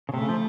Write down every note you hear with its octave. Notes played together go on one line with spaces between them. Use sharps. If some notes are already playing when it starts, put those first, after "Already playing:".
C#3
C3 A3
C#3
F3